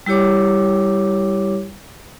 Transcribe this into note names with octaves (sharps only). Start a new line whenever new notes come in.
G3 E4 G4 C#5 D6